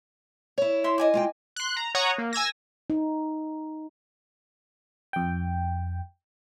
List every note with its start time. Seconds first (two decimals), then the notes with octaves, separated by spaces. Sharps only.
0.58 E4 C#5
0.84 E5 C6
0.98 D#5 G#5 D6
1.14 G#3 F4 G5
1.56 C6 F#6
1.76 A#5
1.95 C#5 F#5 A#5 C#6 D#6
2.18 A#3
2.33 G#5 E6 G#6 A#6
2.90 D#4
5.13 F2 G5